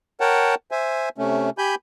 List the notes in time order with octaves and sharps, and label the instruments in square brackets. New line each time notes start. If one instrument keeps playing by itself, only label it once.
[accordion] A#4 C#5 F#5 G5 A5
C5 E5 G#5
C3 A3 C#4
G4 G#5 B5 G6